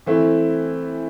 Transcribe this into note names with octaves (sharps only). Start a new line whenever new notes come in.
E3 A3 C4 E4